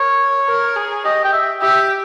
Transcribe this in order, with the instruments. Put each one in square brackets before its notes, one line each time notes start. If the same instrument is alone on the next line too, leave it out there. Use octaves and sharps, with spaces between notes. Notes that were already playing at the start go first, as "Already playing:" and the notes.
Already playing: [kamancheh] A#4 [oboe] C#5
[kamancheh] A#4
G#4
[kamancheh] G4 [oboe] D#5
[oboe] G5
E5
[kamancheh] G4 [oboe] E5